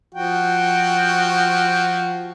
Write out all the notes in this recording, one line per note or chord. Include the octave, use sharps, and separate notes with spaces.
F3 F#4 G5